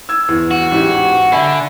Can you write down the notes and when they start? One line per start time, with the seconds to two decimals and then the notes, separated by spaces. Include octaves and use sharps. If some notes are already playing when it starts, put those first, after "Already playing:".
0.09 E6 G#6
0.28 E2
0.51 F#4
0.71 A1 G#2 G4
1.32 D3 E5 G#5 B5